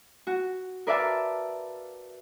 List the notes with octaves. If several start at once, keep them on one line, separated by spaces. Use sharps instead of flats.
F#4
A#4 B4 D5 E5 F5 A5